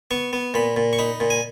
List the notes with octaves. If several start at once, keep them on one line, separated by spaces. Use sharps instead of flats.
B3 C#6
B3
A#2 B5
A#2
C#6
D#4 B5
A#2
G#5